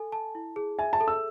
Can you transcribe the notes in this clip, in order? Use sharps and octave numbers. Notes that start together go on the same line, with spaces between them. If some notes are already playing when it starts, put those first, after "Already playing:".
Already playing: A4 G#5
A5
E4
G#4
E5 G#5
A5
A4
E6